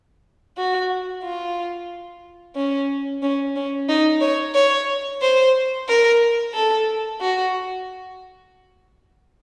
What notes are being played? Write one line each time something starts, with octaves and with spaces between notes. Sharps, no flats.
F#4
F4
C#4
C#4
C#4
D#4
C#5
C#5
C5
A#4
A4
F#4